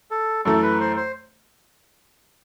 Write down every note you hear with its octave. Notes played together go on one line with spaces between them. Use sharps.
A4
F#2 E3 A3 A4
B4
C5
C5